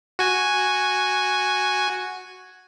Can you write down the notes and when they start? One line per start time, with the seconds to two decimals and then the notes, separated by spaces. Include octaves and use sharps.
0.19 F#4 G#5